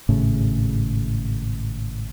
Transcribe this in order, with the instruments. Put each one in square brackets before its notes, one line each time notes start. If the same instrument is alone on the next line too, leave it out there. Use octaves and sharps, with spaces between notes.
[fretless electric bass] G#1 A2 C#3